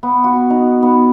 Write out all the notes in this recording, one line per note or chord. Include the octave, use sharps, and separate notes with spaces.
B3
F#4
D#4
B3